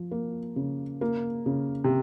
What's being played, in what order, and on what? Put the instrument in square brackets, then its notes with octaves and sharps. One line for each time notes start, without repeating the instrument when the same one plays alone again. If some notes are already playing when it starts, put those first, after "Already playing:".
Already playing: [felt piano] F3
A#3
C#3
A#3
C#3
[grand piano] C3